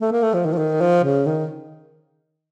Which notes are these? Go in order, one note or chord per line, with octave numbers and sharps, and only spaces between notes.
A3
A#3
A3
F3
D#3
F3
D#3
F3
C#3
D#3